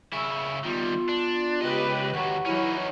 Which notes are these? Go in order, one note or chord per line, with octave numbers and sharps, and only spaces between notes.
C#3 E4 C#6 E6
D#3 G3 B3 F4
D4
C#2 G4 B4 D#5
D#2 F#3 F#5 C#6
E3 F#3 C#4 D#4 E4